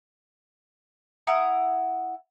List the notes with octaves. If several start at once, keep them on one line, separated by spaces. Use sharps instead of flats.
E4 F#5 A#5 D#6